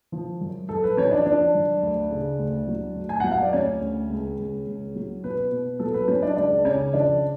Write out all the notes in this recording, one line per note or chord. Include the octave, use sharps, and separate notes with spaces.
F3
F#2
F#2 A4
B4
F3 C#4 C#5
D4 D5
F3 D4 D5
F#2
D2
C#3
D2
F#3
D2
G#5
F#3 F#5
F5
D5
D2 C#4 C#5
D2
C#2
C#2
C#2
F#3
B2 B4
B2
F#3 A4
B4
F#3 C#4 C#5
D4 D5
C#2 D4 D5
C#3 C#4 C#5
F3 D4 D5